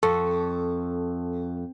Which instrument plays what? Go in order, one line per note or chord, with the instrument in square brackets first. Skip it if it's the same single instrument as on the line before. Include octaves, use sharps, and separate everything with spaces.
[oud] F2 [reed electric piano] A4 C#6